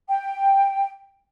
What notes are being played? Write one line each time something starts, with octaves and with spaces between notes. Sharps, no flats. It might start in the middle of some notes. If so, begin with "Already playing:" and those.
G5